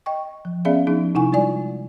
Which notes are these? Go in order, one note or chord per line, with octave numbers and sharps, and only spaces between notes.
D#5 G5 C#6
F3
B3 C#4 G#4 D5 E5 F5
F3 B3 D4 D#4 G#4
C3 D#4 E4 F#5 G#5 C#6
G3 G#3 F4 D5 G#5